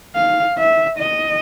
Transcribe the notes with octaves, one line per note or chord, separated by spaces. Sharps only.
F5
E5
D#5